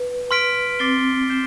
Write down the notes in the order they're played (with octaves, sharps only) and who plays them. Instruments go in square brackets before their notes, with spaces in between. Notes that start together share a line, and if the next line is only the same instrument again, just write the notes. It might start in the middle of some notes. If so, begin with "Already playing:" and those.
Already playing: [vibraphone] B4
[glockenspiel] C6 F6 B6 D7
[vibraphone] C4 [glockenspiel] D6 A6 C7 G7
[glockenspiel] G6 C7 E7 G7